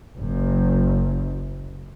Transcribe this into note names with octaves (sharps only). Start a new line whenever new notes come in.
F#1 F#2